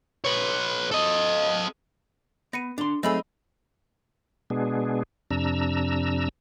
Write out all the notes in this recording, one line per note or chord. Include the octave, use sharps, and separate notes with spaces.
B4 C#5
A4 D#5
B3 A#6 C#7 D#7
D3 D4 C6
F#3 A3 C4 D#4 G#4 D#5 B5 E6
B2 G#3 B3 D4 G#4
F2 C3 D4 A#5 E6